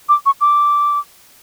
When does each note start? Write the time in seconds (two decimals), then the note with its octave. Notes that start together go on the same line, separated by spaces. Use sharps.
0.09 D6
0.26 C#6
0.41 D6